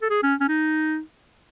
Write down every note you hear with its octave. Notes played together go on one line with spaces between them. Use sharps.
A4
G#4
C#4
C#4
D#4